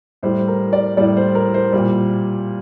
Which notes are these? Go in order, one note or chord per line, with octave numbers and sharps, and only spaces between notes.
A2 G3 C5
A#4
D5
A2 G3 D5
C5
A#4
C5
A#2 G3